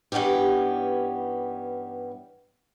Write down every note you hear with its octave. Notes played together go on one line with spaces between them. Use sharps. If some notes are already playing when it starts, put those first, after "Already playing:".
G2 E3 B3 C#4 G4